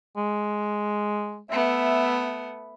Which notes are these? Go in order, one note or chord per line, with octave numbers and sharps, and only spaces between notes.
G#3
A3 B3 E5